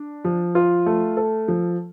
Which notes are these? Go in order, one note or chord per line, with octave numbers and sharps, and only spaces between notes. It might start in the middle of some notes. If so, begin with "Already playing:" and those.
Already playing: D4
F3
F4
A3
A4
F3